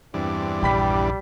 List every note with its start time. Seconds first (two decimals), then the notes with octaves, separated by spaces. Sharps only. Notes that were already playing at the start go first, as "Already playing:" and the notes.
0.14 E2 G2 C4 D4
0.62 A#1 G3 G5 B5 B6